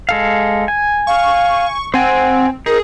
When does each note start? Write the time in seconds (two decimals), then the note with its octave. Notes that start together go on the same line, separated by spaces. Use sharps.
0.09 G#3 A4 F5
0.68 G#5
1.07 F5 C#6
1.94 C4 C5 F#5 G#5
2.66 D#4 G#4 A#4